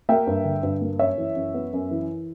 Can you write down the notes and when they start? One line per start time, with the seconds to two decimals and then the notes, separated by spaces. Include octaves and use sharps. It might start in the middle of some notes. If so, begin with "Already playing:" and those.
0.09 A#3 E5 G5
0.27 G2
0.44 D3
0.63 G2
0.81 A#3
0.99 F#2 C#5 E5
1.18 E3
1.35 F#2
1.54 B3
1.73 F#2
1.91 E3